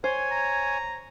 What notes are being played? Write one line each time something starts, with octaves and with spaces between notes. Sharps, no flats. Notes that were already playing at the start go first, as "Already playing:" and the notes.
C5 C#5 G#5
A#5